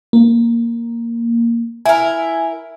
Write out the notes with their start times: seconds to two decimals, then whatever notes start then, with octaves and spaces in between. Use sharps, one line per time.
0.13 A#3
1.86 E4 A#4 G#5